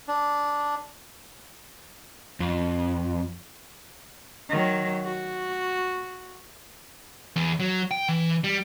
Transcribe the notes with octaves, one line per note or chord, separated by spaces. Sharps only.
D4
F2
D#3 F#3
F#4
E2
F#3
G5
E3
G3